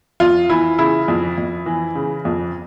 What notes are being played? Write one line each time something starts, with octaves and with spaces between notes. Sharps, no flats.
F2 F4
E3 E4
C#3 E4
F2
F2
E3
C#3
F2